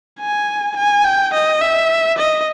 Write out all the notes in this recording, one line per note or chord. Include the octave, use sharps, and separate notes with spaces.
G#5
G#5
G5
D#5
E5
D#5